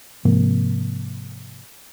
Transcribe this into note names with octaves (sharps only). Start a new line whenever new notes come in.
G#2 C3 F3 A#3